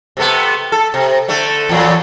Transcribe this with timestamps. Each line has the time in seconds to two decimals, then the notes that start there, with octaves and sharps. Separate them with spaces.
0.17 C3 A3 B3
0.72 A4
0.94 C3
1.28 D3 A3
1.69 E2 A#2 F#3